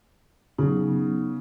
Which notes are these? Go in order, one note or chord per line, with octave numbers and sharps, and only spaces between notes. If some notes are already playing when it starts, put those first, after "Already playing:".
C#3 F#3 B3 D#4